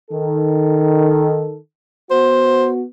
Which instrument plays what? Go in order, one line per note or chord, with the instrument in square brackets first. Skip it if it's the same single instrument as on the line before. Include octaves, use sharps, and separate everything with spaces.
[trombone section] D#3 A4
[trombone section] B3 F#4 [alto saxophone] C5